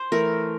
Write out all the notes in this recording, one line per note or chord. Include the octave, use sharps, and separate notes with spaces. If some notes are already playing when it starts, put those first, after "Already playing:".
Already playing: C5
E3 A3 A#4